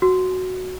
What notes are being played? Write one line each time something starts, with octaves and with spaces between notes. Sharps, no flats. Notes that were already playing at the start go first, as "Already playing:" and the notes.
F#4